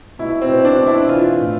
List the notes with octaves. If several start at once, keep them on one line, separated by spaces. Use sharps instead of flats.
B2 E4
C4
B2
D4
B2
E4
E3 F4
A2